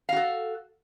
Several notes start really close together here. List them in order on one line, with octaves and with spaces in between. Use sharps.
F5 F#4 A4